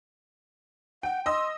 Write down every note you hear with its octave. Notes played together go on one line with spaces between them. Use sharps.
F#5 G5
D#5 C6 E6